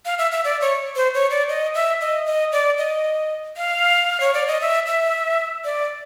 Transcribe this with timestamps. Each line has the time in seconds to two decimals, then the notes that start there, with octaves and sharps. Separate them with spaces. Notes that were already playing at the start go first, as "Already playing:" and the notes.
0.05 F5
0.18 E5
0.32 E5
0.44 D5
0.61 C#5
0.96 C5
1.14 C#5
1.31 D5
1.49 D#5
1.75 E5
2.01 D#5
2.26 D#5
2.52 D5
2.78 D#5
3.57 F5
4.20 C#5
4.34 D5
4.47 D#5
4.61 E5
4.86 E5
5.64 D5